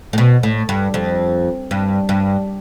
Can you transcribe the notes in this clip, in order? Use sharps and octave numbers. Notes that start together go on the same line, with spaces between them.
A2
B2
A2
G2
F2
G2
G2